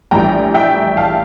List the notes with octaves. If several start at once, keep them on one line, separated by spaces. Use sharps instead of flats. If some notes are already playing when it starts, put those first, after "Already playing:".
A#1 A2 E3 G3 G5 A#5
E5 G5
F5 A5